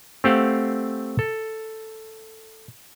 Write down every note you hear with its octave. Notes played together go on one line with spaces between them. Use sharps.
A3 C4 G4 C5 F5 F#5
A4